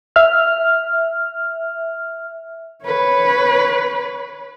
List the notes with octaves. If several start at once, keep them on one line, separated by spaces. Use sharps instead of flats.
E5 F6
B4 C#5